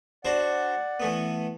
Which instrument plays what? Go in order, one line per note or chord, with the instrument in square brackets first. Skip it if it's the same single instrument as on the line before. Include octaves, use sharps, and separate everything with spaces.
[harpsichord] D4 F#4 C5 [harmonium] D5 F#5
[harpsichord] E3 A3 B3